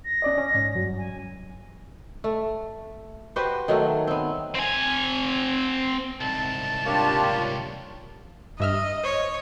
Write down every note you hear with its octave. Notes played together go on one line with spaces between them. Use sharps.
A#6
C#4 D5 D#5
C#4
G#2
G2 F#3
G#5
A3
F#4 G4 B4 C5
D#3 F#3 A3
B3 C4
C4 G#5
C2 G#2 A5
G3 A#3 D4 F4 G4 C#5
G2 D#5 E5 F6
C5 C#5